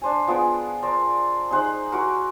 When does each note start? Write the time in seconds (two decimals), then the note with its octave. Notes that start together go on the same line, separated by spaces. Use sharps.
0.02 D4 C5 G#5
0.27 F3 B3 G#4 G5
0.82 A#4 C5 D5
1.51 D#4 G#4 C5 F#5
1.92 E4 F#4 A#4